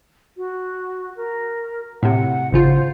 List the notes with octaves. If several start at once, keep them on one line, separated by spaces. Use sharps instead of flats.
F#4
A#4
A2 C3 F#5
G#1 C#3 F4 C5